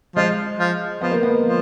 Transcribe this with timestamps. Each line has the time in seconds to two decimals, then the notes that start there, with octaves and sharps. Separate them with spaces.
0.16 F3 G#3
0.59 F3
1.01 F3 B3
1.12 A#3
1.23 B3
1.43 F3